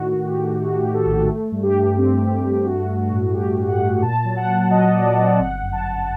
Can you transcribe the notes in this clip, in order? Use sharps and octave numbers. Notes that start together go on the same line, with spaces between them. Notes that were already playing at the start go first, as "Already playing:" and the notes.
Already playing: A2 D#3 F#4
A2
G4
A3
A3 F#4
G4
A2
A4
A#1
A4
A3
G2
G4
G2
C4
C4
G2
A3 F#4
A3
F#4
A2
A3 G4
A2
F#5
A3
A#2 A5
F#3
F#5
A#2
F#3 D#5
A#2 D5
C4 D5
G1 F#5
F#2
A5
G1